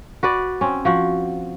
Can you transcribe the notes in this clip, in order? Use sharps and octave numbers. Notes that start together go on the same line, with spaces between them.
F#4 B4 D5
C4 C#4
F3 F#4